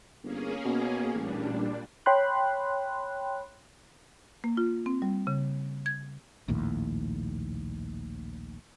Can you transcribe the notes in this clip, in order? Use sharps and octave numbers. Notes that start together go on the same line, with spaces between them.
G1 A#3 C#4 G#4
B2
A1 A#2 G3 D4
C#5 G5 B5 C6 F#6
A#3
F4
C4
G3
C#3
G#6
A#1 D#2 A2